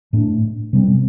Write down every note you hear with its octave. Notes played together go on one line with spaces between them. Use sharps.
A2 A3 D4
C3 G3 C4